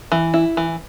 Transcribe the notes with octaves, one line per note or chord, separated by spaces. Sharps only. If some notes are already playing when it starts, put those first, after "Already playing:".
E3
E4
E3